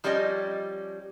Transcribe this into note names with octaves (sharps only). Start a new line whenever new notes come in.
F3 G3 C#4 G4 D5 D#5